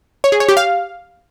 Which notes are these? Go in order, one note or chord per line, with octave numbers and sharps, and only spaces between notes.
C#5
G#4
C#5
G4
F5